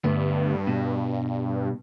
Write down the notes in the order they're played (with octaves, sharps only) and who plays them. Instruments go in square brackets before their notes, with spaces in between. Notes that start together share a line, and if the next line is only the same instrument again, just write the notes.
[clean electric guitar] D2 A3 B3 [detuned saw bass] G2
[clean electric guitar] B2